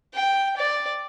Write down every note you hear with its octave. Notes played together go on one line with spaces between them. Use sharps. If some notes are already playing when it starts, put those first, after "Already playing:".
G5
D5